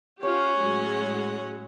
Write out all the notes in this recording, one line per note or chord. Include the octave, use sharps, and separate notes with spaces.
C#4 F4 G4 C#5 F#5
A2 F#3 G#3